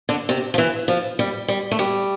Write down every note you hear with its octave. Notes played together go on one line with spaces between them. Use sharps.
D3
C3
F3
E3
F3
G3
G3
A3
G3